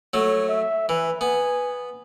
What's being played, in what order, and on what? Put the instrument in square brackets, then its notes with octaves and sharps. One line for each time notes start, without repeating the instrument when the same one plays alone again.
[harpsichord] F#3 A3 [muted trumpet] C#5
[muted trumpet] E5
[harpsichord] E3 [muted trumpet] B4
[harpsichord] B3 [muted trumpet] G#5